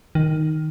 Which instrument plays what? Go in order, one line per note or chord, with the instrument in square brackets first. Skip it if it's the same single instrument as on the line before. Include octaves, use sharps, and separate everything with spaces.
[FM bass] D#3